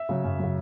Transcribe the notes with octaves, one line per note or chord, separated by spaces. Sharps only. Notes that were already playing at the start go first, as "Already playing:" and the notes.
Already playing: E5
C#3 F#3
F#2
C#3 F#3